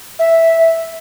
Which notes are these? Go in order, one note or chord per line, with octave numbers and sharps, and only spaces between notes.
E5